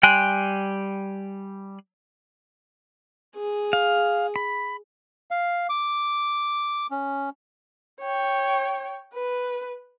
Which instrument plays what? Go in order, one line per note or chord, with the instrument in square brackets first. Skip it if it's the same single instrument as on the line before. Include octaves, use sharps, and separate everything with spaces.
[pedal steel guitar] G3 G5 G#5 C6 F#6
[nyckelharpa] G#4
[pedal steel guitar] F5
B5
[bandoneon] F5
D6
C#4
[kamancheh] C#5 G5
B4